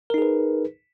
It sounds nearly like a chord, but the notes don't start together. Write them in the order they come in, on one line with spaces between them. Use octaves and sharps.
A#4 D#4 G#4 B4